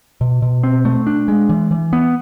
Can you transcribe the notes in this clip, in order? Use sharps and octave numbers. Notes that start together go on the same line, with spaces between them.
B2
B2
C4
A3
D4
G#3
E3
E3
B3